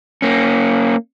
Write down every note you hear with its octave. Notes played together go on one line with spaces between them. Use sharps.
A#3 C#4